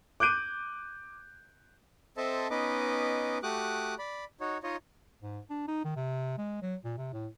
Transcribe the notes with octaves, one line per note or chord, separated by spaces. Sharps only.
D6 F#6 G6 D7 D#7
C4 A4 C5 D#5 E5 A5
B3 C#4 D#4 B4 D#5 D6
A3 F#4 G4 D6 D#6 F#6
D5 B5
D#4 F#4 C#5
D#4 F4 C#5 D#5
G#2
D4
D#4
D#3
C3
G#3
F#3
A#2
C3
A2